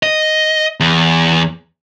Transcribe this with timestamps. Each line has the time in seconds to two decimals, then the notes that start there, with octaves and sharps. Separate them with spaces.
0.03 D#5
0.80 E2